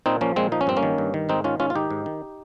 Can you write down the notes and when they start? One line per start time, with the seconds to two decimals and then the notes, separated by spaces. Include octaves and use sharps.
0.06 A#2 C4 D#4
0.21 F3 A#3 C#4
0.36 A#2 G#3 C4
0.52 F3 D#4
0.61 C#4
0.67 G2 C4
0.77 A#3 C#4
0.83 D#3
0.98 G2
1.14 D#3
1.29 G#2 C4 D#4
1.44 D#3 C#4 F4
1.59 G#2 C#4 F4
1.70 F4
1.75 D#3 D#4 G4
1.91 G#2
2.06 D#3